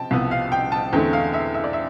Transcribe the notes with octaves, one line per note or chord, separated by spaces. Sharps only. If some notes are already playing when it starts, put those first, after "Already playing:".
Already playing: C3 F3 G5 A5
C2 C3 F3 B3
F5
G5
A5
E2 D3 A3 C4 G5
F5
E5
E5
D5
E5